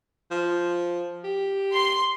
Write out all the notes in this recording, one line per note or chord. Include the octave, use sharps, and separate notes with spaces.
F3
G4
C6